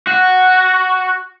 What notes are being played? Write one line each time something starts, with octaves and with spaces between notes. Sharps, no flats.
F#4